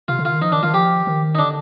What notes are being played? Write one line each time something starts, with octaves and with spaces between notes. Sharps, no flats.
C3 F4
D3
D#3 F4
F3 D#4
D#3 D4
D#3 F4
F3 G4
D#3
D#4
D3 D4